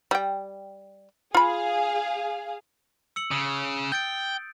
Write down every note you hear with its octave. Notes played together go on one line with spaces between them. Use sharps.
G3 G5
F4 G#4 F5 B5
E6 C#7 F#7
C#3 D#6
G5 G6 A6 D7